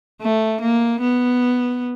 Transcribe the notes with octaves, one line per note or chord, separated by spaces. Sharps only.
A3
A#3
B3